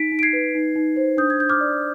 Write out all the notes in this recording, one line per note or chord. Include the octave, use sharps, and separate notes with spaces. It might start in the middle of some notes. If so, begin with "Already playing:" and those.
Already playing: D#4 B6 D7
D#4
D7
G#6 C7
B4
D#4
D#4
C5
D4 D#6 G6
G#6
D4 G6
D6 F6
D5